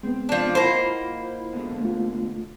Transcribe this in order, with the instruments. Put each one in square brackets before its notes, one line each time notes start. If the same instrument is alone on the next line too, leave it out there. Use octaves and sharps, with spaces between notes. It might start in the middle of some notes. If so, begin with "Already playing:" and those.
[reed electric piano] G#3 B3 [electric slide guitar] C4
[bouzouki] F3 D4
[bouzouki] A#3 C5 [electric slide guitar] E4 F#5 [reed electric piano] F4 D#5 B5
[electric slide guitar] B2 D3 G#3
[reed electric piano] A3 F4